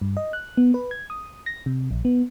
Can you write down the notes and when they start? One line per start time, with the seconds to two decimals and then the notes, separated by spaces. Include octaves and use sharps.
0.01 G2
0.17 D#5
0.33 F#6
0.57 B3
0.74 B4
0.91 G#6
1.10 D#6
1.46 A#6
1.66 C3
1.91 A#1
2.05 B3